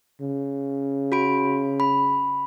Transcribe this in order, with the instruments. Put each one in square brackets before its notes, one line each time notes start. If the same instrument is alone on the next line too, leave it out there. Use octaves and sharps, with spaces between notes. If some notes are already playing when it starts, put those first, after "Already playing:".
[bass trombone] C#3
[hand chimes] F#4 B5 D7
B5